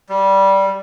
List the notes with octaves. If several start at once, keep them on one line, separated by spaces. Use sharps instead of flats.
G3